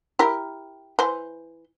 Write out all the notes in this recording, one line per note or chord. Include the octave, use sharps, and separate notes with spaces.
E4 G4 A#4
E3 C5